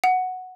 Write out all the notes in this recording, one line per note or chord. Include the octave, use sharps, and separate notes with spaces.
F#5